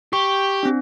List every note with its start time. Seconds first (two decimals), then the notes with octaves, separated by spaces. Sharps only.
0.13 G4 C#6
0.63 C4 D4